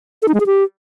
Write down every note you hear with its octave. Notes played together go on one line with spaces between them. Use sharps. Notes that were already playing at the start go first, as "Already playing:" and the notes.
A4
D#4
G#3
G#4
G4